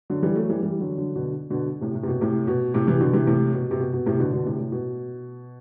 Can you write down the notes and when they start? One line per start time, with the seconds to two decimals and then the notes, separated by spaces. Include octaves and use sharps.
0.10 D3 F#3
0.23 E3 G3
0.36 F#3 A3
0.49 E3 G3
0.63 E3 G3
0.80 D3 F#3
0.98 D3 F#3
1.15 B2 D3
1.50 B2 D3
1.81 A2 C3
1.95 A2
2.03 C3
2.08 B2
2.21 A2 C3
2.47 B2
2.74 A2 C3
2.87 C3 E3
3.00 B2 D3
3.13 C3 E3
3.27 A2 C3
3.54 B2
3.71 C3
3.80 B2
3.93 B2
4.06 A2 C3
4.19 B2 D3
4.33 B2 D3
4.46 A2 C3
4.59 A2
4.72 B2